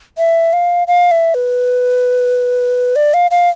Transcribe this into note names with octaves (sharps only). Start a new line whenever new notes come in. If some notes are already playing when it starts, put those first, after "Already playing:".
E5
F5
F5
E5
B4
D5
F5
F5